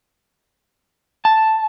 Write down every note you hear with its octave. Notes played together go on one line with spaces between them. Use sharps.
A5